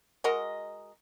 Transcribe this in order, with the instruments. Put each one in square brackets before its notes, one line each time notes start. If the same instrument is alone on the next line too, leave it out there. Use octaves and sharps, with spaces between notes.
[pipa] G#3 F#4 A#4 D#5